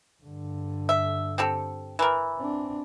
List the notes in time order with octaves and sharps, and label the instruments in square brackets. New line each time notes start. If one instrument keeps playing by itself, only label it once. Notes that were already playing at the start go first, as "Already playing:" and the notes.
[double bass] G2 D3
[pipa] E5
C4 G4 A4
E3 A#4
[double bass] C4 D4